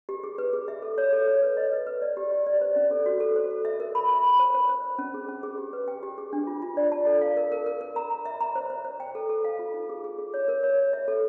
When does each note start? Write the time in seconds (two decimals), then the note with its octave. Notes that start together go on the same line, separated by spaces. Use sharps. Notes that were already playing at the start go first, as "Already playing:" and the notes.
0.09 G4
0.23 G#4
0.38 B4
0.53 G#4
0.68 E5
0.82 A4
0.98 C#5
1.13 A4
1.27 C#5
1.42 B4
1.57 D#5
1.72 B4
1.87 B4
2.02 D5
2.17 G4
2.31 G4
2.46 D5
2.61 C5
2.76 C#4
2.91 A4
3.06 F#4
3.20 A4
3.36 C5
3.51 A4
3.65 E5
3.80 A#4
3.95 B5
4.10 B5
4.24 B5
4.39 C5
4.54 C5
4.69 C5
4.84 C5
4.99 C#4
5.14 G#4
5.29 C#4
5.43 G#4
5.58 G4
5.73 B4
5.88 G5
6.03 G4
6.18 G#4
6.33 D4
6.47 F4
6.62 F4
6.77 D5
6.92 A5
7.06 A4
7.21 F5
7.37 A#4
7.52 A#4
7.66 A#4
7.81 A#4
7.96 A#5
8.10 A#5
8.26 E5
8.41 A#5
8.55 C5
8.70 C5
8.85 C5
9.00 G5
9.15 A4
9.29 A4
9.44 F5
9.59 F4
9.74 D#4
9.89 G#4
10.04 G#4
10.18 G#4
10.34 C#5
10.48 A#4
10.63 C#5
10.78 C#5
10.93 E5
11.08 A4